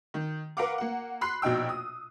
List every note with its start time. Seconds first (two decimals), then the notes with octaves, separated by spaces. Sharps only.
0.14 D#3
0.57 A#4 B4 F5 F#5 D6
0.78 A#3 F#5
1.21 B5 C6 F#6 C7
1.42 A#1 B2 D#4 G5 E6
1.69 D#6